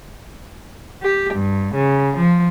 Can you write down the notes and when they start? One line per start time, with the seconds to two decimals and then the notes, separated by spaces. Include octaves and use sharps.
1.02 G4
1.34 G2
1.75 C#3
2.17 F3